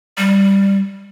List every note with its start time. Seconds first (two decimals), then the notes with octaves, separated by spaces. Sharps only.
0.18 G3